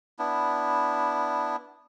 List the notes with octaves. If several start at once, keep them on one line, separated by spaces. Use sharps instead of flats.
B3 D4 E4